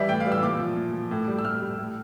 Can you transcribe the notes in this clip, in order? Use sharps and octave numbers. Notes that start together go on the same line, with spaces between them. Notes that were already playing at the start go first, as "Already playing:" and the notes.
Already playing: E3 G3 D5 E5
A2 G5
F5
E3 G3
E6
A#2 D6
F3
A#2
F3
A2
G3
E6
A2 F6
G3
A2